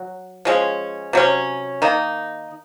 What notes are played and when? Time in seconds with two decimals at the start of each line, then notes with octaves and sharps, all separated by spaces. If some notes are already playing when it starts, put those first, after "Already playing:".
Already playing: F#3 F#4
0.45 F3 G#3 C#4
1.13 C3 F#3 C#4
1.82 D#3 A#3 D#4